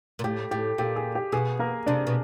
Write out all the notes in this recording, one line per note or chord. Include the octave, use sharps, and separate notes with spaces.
A#2
A2 G4
A2 G4
A#2 G4
G#4
G4
B2 G#4
A#3 A#4
C3 D4 D5
B2